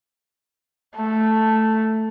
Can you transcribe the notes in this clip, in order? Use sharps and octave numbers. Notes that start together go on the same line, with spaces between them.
A3